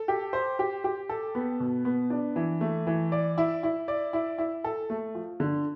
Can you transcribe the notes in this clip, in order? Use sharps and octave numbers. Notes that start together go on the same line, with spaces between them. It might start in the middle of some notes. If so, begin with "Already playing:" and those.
Already playing: A4
G4
C5
G4
G4
A4
B3
B2
B3
D4
E3
A3
E3
D5
E4
E4
D5
E4
E4
A4
A3
F3
D3